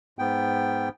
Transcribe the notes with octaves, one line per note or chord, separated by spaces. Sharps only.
G#2 B3 G5